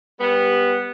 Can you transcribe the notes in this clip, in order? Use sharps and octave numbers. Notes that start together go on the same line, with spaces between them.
G3 B3